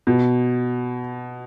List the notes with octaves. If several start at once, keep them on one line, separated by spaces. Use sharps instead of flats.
B2